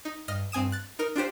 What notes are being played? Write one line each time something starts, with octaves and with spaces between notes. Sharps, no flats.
D#4
G2 D#5 F6 A#6
G2 C4 G#5 D#6 E7
F#6 A6
D#4 A#4
D4 F4 G4 C5